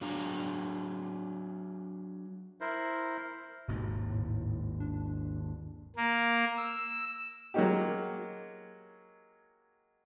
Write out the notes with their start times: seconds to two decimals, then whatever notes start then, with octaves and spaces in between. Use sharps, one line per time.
0.01 F#3 D4 G#4 F5 A#5
2.61 E4 A#4 C5
3.68 G#1 D#2 G#2 B2
4.09 A2
4.80 D4
5.96 A#3
6.57 E6
7.54 F#3 G#3 A#3 C#4 D#4 G4